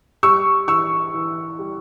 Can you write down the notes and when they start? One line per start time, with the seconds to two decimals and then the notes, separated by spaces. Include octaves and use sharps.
0.23 G3 C#6 E6
0.68 E3 C#6 E6
1.14 E3
1.59 G3